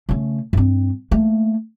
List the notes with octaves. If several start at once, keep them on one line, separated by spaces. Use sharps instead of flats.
C#3 A3
G2 C4
A3 A#3